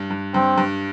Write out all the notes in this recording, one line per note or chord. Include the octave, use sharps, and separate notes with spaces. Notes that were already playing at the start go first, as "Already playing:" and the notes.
Already playing: G2
G2
G2 C4
G2